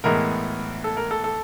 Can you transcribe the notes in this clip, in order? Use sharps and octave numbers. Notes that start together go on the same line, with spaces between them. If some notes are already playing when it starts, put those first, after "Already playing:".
A2 E3 G#3 B3 A#4
A4
A#4
A4
A4